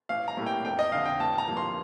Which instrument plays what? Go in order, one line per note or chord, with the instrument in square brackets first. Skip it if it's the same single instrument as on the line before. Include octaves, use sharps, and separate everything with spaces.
[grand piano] A1 F5
A#5
A2 G3 A#3
G5
F1 G5
D#5
F2 D3 F5
G5
A1 A5
A#5
G2 F3 A#3
C6